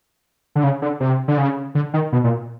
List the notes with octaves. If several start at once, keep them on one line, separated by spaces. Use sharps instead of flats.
D3
C#3
D3
C3
D3
C#3
D3
D#3
B2
A#2